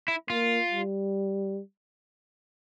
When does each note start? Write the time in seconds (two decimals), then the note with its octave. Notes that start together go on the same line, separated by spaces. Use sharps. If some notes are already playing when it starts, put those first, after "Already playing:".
0.08 E4
0.30 A#3 F4
0.71 G3